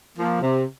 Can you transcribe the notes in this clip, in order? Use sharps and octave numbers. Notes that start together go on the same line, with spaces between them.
F3 A#3
C3